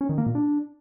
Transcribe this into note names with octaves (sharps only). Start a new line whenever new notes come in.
C#4
D#3
A#3
A#2
D4